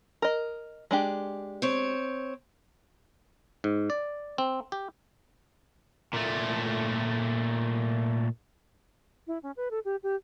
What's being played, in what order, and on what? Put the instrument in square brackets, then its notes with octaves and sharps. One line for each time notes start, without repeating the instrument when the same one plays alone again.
[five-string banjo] A#4 D#5
G#3 D4 G4
[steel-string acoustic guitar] C4 C#5
[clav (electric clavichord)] G#2
D5
C4
G4
[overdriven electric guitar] A#2 A3
[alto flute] E4
C#4
B4
A4
G4
G4